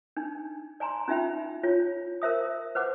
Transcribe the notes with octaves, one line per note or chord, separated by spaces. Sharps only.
D4 D#4
D5 G#5 A#5 C6
C#4 D#4 F4 E5 G5 B5
F4 C#5
A#4 C5 E5 D#6
B4 C5 F#5 D6